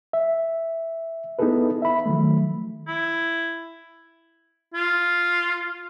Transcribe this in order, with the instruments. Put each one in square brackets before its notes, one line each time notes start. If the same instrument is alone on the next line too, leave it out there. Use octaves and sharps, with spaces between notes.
[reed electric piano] E5
B3 D#4 E4 G#4 A4 B4
E5 B5
D#3 F3 F#3 A3
[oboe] E4
[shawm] F4